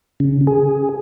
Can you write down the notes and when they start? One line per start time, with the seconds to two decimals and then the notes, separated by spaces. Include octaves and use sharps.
0.20 C#3
0.47 G#4